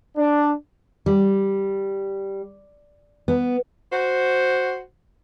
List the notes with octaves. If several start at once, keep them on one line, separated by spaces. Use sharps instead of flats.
D4
G3
B3
F#4 C5